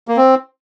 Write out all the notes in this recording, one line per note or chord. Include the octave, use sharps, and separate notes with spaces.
A#3
C4